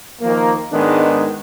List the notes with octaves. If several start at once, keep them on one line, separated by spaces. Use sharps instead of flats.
D#3 F3 A#3
G#2 D#3 G#3 B3 D4